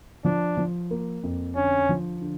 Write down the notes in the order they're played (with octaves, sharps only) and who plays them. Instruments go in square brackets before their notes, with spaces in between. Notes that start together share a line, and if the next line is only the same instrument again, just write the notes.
[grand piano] F3 [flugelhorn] D4
[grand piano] F3
A#3
F2
[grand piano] D3 [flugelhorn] C#4
[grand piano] F3
D3